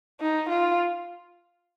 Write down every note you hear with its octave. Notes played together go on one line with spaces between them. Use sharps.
D#4
F4